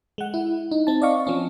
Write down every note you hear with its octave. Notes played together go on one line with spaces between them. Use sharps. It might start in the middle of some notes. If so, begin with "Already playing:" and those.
G#3 F#5
E4
D#4
C4 A5
D5 D#5 F5 C#6
F3 C4 C#4